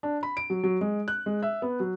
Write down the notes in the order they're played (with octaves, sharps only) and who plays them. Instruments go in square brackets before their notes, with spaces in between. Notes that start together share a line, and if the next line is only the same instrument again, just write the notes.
[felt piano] D4
B5
D7
F#3
F#3
G#3
F#6
G#3
E5
B3
F#3